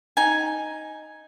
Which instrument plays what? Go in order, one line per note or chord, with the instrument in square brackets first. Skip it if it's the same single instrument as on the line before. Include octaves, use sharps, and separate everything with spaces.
[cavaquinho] D#4 G#5